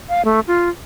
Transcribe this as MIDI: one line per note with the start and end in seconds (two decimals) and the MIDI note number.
0.09 0.22 77
0.25 0.40 57
0.48 0.70 65